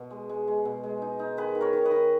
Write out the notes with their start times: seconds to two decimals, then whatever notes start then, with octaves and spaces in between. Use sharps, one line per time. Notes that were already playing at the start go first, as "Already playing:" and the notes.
Already playing: B2
0.10 G#3
0.29 G#3
0.48 G#3
0.65 B2
0.83 G#3
1.02 D#4
1.19 D#4
1.37 D#3 G#4 B4
1.55 D#3
1.61 A#4 C#5
1.73 D#3
1.85 B4 D#5
1.91 D#3